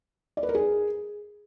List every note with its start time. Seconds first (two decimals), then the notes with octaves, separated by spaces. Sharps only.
0.37 D5
0.43 B4
0.49 A#4
0.55 G#4